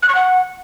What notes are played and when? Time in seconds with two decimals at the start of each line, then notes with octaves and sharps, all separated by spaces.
0.03 F#6
0.09 C#6
0.15 F#5